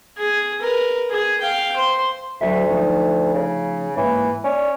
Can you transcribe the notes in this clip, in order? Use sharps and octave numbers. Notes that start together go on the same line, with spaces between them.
G#4
A#4 B4
G#4
F5 G5
C5
D2 F#3 F#4 E5
F3 A3 D#4
C#3
G#2 E3 A#3
C#4 D5